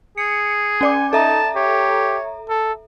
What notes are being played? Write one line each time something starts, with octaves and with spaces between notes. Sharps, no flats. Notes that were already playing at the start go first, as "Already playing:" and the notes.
G#4 C#7
C#4 D5 G#5 D6
D#4 A4 E5 A5 A#5
G4 C#5
A4